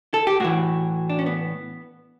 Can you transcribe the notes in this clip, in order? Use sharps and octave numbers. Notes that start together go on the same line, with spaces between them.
A4
G4
A2 E3 F#4
D4
C#4
B3